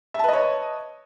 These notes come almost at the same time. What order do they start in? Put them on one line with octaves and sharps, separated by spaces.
E5 A5 B4 D#5 C#5